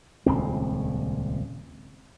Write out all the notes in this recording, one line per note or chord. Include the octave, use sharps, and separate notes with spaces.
D#1 C#2 C4